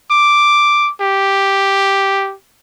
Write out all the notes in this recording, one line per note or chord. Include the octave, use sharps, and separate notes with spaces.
D6
G4